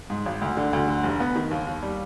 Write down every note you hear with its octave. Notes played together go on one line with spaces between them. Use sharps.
G#2
G#1
D2
D3
D2
D3
F1
B3
D#3
D#2
D#2
G3